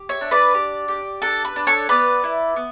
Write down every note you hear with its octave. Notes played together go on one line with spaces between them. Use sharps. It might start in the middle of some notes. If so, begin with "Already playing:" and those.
Already playing: G4
C#5 E5
D4
B4 D5
G4
G4
D4 A4
B4
D4
A4 C#5
B3 B4 D5
E4
B3